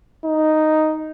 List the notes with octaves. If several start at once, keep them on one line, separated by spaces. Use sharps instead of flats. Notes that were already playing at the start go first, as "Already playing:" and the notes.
D#4